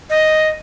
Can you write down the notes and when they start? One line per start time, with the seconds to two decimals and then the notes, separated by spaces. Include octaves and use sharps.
0.10 D#5